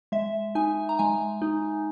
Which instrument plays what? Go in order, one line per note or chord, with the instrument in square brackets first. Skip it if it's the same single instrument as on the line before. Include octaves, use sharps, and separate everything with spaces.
[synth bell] G#3 E5
D#4 G#5
A#5
G#3 G#5
D#4